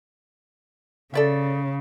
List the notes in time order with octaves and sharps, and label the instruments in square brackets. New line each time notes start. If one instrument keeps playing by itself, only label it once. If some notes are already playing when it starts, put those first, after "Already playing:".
[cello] C#3 [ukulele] A4 D5 E5